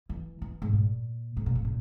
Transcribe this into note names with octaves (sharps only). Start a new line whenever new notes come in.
E3
E3
G#2
A#2
G#2
A#2
G#2
A#2